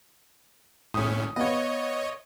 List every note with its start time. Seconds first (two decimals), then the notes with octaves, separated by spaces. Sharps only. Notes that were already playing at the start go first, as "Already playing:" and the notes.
0.94 A2 C#4 D#6
1.36 B3 C#5 D#5 F5